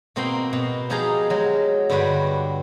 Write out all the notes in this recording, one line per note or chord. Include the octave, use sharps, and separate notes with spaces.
B2 A#3 C4 F#4 G5 C6
B2
F3 D#4 G4 G#4 F5 A#5
F#3 G#3
G2 D3 G3 F#4 B4